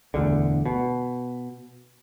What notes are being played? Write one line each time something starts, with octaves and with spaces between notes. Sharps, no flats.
E1 D2 D3
B2